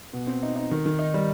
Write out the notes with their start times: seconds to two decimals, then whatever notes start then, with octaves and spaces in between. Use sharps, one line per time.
0.13 B2
0.27 C4
0.43 D#4
0.56 D#4
0.71 D#3
0.86 D#3
0.99 D#4
1.14 G3